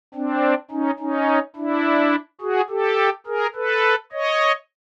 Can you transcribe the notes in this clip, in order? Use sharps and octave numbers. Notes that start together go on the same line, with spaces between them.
C4 D4
C#4 D#4
C#4 D#4
D4 E4
F#4 G#4
G4 A4
G#4 A#4
A4 B4
C#5 D#5